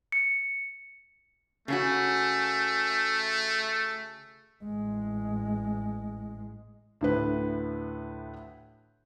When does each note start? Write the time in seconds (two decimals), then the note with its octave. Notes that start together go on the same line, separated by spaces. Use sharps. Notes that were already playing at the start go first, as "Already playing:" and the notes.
0.12 C#7
1.68 C#3 A3 C#4 F#4
4.64 A1 G#3
7.01 D2 A2 B4